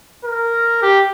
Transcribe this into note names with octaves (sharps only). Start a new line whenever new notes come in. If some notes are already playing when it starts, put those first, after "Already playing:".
A#4
G4